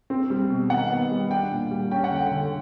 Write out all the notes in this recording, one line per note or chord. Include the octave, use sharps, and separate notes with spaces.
C4
G3
B2
D#3 F#5
B3
G3
D4 G5
A#2
G3
C#4 G5
F#5
D3 G5
D3